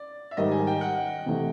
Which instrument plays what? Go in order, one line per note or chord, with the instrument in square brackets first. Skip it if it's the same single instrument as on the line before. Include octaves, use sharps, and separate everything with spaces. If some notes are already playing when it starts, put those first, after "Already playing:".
Already playing: [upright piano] D5
E5
[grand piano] G#2 D#3 G3 [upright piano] D#5
[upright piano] G#5
G5
F#5
[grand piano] C3 E3 A3